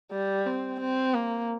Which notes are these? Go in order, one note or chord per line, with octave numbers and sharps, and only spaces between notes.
G3
C4
C4
A#3